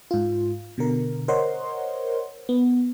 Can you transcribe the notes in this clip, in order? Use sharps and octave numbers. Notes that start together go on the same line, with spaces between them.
G#2 F4
B2 D3 A#4
A#4 C5 C#5 D#5 F#5 C6
B3